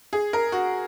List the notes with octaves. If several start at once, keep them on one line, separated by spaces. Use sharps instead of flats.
G#4
A#4
F#4